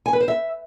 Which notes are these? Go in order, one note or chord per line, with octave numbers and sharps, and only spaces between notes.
G#5
B4
C5
E5